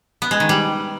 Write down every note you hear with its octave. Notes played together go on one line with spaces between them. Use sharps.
B3
G#3
D#3
G3